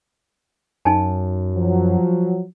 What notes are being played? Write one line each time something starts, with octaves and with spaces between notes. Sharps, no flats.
F#2 D#4 G#5 A5
F3 F#3